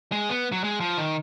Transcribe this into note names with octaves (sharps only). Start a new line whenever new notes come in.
G#3
B3
F#3
G#3
F3
D#3